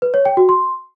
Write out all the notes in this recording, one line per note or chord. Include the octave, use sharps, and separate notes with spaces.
B4
C#5
G5
F#4
C6